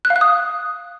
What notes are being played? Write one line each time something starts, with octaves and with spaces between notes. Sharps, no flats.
F#6
F5
F#6
D#6